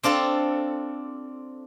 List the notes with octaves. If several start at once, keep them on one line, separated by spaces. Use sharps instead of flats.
C4 D4 F4 A4